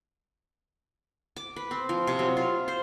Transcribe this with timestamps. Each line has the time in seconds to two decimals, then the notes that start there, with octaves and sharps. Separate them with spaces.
1.36 D6
1.56 B4
1.71 C4
1.89 F3
2.07 C3
2.19 F#3
2.37 F4
2.68 C5